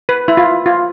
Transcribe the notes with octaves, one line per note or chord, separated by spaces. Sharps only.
B4
E4
F4
F4